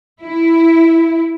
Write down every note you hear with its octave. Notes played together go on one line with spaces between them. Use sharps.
E4